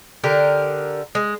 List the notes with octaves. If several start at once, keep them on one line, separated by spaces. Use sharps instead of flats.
D3 G4 A#4
G#3